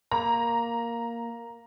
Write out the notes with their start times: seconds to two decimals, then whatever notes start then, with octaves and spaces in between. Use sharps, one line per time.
0.11 A#3 A#5